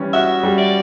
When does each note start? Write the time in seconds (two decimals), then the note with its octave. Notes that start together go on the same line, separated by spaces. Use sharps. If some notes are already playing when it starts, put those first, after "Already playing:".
Already playing: E3 G3 C#4
0.13 F#4 E5
0.43 G3
0.58 D5